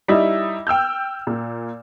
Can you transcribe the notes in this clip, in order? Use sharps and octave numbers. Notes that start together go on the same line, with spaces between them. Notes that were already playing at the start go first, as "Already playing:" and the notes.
G3 D#4 E4
G5 E6 F6 G6
A#2